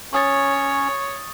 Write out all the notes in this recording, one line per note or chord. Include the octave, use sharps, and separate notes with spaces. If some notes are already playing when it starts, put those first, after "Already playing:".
C#4 C#5 C#6 D#6 A6